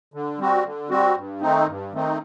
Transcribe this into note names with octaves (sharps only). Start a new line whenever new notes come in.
D3
G3 C4 F#4
D3
G3 C4 F#4
G2
D#3 A3 C4 D#4
G2
D#3 A3 C4 D#4